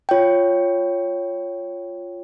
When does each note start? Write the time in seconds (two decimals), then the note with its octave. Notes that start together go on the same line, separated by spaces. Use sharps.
0.09 F4 C#5 G5